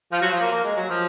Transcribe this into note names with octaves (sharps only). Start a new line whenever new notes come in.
F3 F4
F#3 F#4
F3 F4
A#3
A#3
G#3
F#3
F3